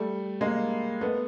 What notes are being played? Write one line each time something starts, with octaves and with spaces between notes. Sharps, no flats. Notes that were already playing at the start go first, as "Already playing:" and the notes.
Already playing: G3 A3
G#3 A#3
A3 B3